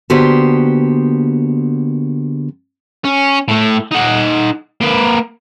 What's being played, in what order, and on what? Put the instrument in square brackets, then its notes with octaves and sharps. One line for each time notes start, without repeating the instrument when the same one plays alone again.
[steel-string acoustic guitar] D3 A#3 B3 F#4 G4 C5
[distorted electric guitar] C#4
A2 A3
D#4 F#5
A#3 B4